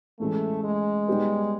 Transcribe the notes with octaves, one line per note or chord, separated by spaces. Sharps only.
A2 E3 G#3 A3 C#4
G#3
G3 B3 D#4 G4 B4